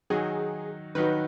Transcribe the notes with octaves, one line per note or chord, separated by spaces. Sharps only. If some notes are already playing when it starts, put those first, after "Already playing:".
D#3 F#3 D#4 F#4 G#4
D#3 F#3 D#4 F#4 B4